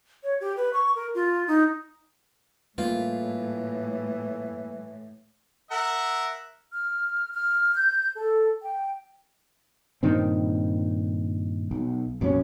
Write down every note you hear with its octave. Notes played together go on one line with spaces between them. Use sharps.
C#5
G4
B4
C#6
A#4
F4
D#4
A2 E3 G3 A3 A#3 F4
A#4 E5 F#5
F6
F6
G6
A4
G5
G2 A#2 D#3 C4
B1
A#1 F#2 C3 C#4